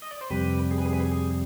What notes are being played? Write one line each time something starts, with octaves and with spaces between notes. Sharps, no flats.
D#5
D5
C5
F2 C3 G3 G4 B4
G#4
B4
G#4
B4
G#4
G#4